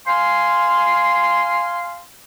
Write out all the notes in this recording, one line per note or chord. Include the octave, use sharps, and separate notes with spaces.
F5 G#5 C6